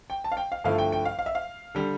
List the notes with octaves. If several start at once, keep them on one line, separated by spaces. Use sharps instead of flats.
G5
A5
F5
G5
F5
G2 D3 F3 A3 E4 F5
G5
G5
F5
F5
E5
F5
D3 G3